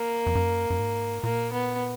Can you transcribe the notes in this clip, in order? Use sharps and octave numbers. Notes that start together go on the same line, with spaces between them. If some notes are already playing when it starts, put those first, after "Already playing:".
Already playing: A#3
F2
F#2
F#2
G#2
A#2 A#3
B3